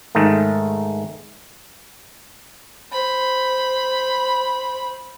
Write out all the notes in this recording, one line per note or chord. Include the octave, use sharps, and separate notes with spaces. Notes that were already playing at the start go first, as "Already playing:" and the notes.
G#2 D#3 A3
C5 B5